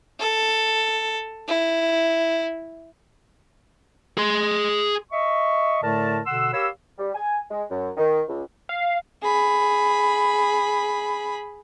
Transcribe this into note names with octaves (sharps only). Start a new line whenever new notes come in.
A4
E4
G#4 C6
D#5 E5 C#6
A2 D3 A3 A#4 D5 A5
B2 D3 F#5 C6 E6
G4 A#4 C#5 F5 B5 E6
G3
G#5
G#3
F#2
D#3
C#2
F5
G#4 B5